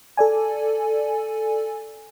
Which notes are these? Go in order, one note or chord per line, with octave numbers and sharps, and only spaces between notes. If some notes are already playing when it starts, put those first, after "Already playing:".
A4 D5 G#5